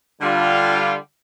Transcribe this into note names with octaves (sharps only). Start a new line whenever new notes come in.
D3 G3 F4